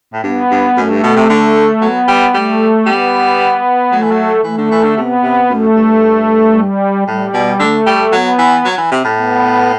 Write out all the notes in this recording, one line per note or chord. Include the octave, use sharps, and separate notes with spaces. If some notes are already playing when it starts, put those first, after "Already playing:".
A2
G2 B3
G2
F#2 A3
G2
B2
C3
D3
F#3 B3
G3
G3 A3
G3 B3
F#3 A3
E3
F#3
E3 A3
D3
E3
D3
C3 B3
C3
F#2 A3
G2
G3
A2 G3
B2
D3 A3
G3
F#3 B3
E3
F#3
E3
C3
A2
B3